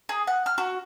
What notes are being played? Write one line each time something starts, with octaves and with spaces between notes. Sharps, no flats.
G#4
F#5
F6
F#4